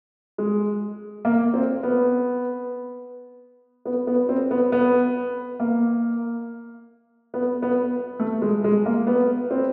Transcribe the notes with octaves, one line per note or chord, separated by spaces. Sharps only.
G#3
A#3
C4
B3
B3
B3
C4
B3
B3
A#3
B3
B3
A3
G#3
G#3
A#3
B3
C4